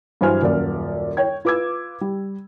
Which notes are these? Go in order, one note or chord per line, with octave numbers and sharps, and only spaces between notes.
G2 E3 F#3 C5 G#5 F6
D#1 F#2 D5
C#5 G5 G#6
F4 B4 D6 E6 G#6
G3